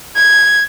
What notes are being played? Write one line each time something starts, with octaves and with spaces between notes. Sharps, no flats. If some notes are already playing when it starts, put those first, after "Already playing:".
G#6